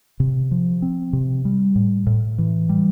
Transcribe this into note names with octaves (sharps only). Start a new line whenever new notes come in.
C3
F3
C4
C3
G3
A2
A2
E3
G3